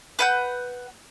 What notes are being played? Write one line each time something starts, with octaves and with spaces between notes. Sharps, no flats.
B4 F#5 G6